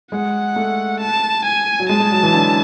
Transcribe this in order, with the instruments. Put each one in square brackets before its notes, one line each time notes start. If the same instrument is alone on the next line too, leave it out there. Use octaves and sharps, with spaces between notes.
[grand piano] G#3 [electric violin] F#5
[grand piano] A3
[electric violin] A5
G#5
[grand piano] F#3
[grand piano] G#3 [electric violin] A5
[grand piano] G#3
F#3
E3
D3